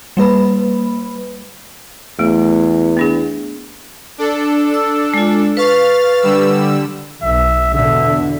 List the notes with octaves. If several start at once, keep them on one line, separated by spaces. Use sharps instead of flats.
G3 A#3 B4 B5
E2 A3
B3 D4 G#4
D4 A4
E6
G#3 F4
B4 F5 C#6 F6 A6
D3 G3 E6
B1 E5
E2 B2 D3 E5